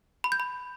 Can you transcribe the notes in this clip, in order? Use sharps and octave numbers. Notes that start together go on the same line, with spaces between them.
B5
G6
B5